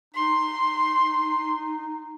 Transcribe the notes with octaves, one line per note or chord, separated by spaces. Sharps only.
D#4 C6